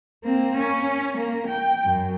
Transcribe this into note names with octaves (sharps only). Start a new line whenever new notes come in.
A#3 C4
C#4
A#3
G5
F#2